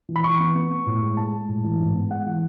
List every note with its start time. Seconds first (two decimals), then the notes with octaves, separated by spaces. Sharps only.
0.09 E3
0.16 B5
0.24 E3 C#6
0.40 B3
0.55 B3
0.71 B3
0.86 A2
1.02 G#3
1.17 G#3 A5
1.33 G#3
1.49 A2
1.64 E3
1.80 G#2
1.95 B3
2.11 G#3 F#5
2.26 E3